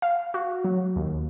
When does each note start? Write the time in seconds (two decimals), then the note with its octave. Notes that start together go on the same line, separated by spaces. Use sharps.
0.02 F5
0.34 F#4
0.64 F#3
0.96 D#2